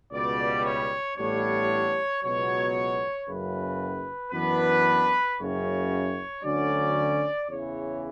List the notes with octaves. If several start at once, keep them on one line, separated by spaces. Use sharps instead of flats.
C#2 B2 G3 D5
C#5
A1 A2 G3 B3 D4 C#5
C#2 B2 F#3 B3 C#5
F#1 F#2 C#3 B4
F#2 E3 B3 D4 B4
F#1 F#2 C#3 C#5
D2 D3 F#3 C#4 D5
E2 C#3 E3 C#5